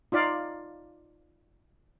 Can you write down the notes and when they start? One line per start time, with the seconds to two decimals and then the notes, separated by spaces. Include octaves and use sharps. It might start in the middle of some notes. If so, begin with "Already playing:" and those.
0.12 D#4 F4 D5 F5